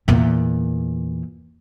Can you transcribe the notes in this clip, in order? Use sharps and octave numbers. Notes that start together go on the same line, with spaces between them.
E2 A#2